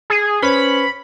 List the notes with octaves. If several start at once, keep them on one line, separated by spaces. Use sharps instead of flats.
G#4
C#4 B4 C5 B5